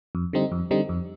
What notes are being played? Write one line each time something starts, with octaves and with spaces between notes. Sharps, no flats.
F2
D3 G3 C4 D#4
F2
D3 G3 C4 D#4
F2